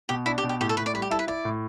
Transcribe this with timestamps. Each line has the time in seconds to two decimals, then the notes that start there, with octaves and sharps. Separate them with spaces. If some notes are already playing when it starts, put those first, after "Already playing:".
0.09 B2 G4
0.26 D4 E4
0.38 G4
0.43 B2
0.49 G4
0.61 A2 G4
0.69 A4
0.77 A2 B4
0.86 D5
0.94 G3 B4
1.02 G4
1.11 E4 A4
1.19 B4
1.27 E4 D5
1.45 A2